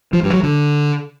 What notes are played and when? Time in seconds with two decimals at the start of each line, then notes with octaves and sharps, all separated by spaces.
0.13 F3
0.23 G2
0.33 F#3
0.43 D3